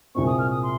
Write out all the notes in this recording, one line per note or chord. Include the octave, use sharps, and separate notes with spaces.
C2 A#2 G#3 C4 C#6
D#6
F6
D#6
C6